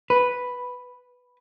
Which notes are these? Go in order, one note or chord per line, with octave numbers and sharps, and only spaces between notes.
B4